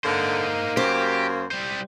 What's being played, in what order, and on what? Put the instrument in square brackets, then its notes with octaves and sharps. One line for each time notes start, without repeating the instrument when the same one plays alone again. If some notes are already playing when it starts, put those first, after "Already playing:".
[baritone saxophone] D3 [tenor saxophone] A#3 [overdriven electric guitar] D#4 C5
[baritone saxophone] F#2 [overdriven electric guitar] G4 [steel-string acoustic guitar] C5
[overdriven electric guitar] G3 C5